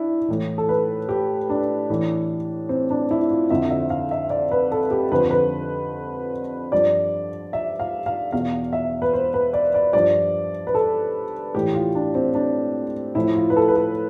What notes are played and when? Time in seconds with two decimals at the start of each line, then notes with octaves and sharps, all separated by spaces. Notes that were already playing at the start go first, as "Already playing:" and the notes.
Already playing: D4 E4
0.28 A2 E3
0.58 A4
0.69 B4
1.09 G4
1.49 D4
1.90 A2 E3
2.69 C4
2.90 D4
3.11 E4
3.31 F4
3.50 F2 D3 F3 E5
3.71 E5
3.90 F5
4.11 E5
4.30 D5
4.51 B4
4.72 A4
4.91 G4
5.12 F2 D3 F3 B4
5.20 C5
5.31 B4
6.72 G2 F3 D5
7.53 E5
7.79 F5
8.06 F5
8.32 E2 B2 F5
8.73 E5
9.02 B4
9.13 C5
9.34 B4
9.53 D5
9.74 D5
9.93 G2 F3 D5
10.67 B4
10.75 A4
11.55 A2 E3 G4
11.74 F4
11.95 D4
12.15 C4
12.35 D4
13.15 A2 F3 E4
13.35 F4
13.50 B4
13.56 A4
13.68 B4
13.76 A4